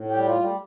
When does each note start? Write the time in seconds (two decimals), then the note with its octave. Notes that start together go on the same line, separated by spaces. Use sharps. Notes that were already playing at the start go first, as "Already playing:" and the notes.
Already playing: A2
0.08 G4
0.14 G3
0.25 F4
0.37 G3
0.43 A3